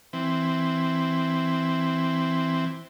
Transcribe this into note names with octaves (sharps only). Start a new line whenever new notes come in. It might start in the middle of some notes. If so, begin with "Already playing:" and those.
E3 C4